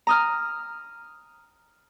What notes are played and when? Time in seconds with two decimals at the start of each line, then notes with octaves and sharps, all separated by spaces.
0.07 A#5 D#6 F6